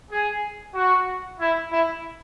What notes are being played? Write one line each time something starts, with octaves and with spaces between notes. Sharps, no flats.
G#4
F#4
E4
E4